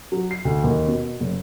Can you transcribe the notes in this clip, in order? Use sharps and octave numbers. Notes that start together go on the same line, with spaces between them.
F#3
C7
D2
D#2
B2
F#1